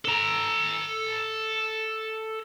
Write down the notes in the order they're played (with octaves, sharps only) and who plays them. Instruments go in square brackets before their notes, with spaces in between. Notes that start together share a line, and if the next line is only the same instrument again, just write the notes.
[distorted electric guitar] A4 A#5